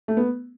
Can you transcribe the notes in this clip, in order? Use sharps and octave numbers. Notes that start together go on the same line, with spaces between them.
A3
B3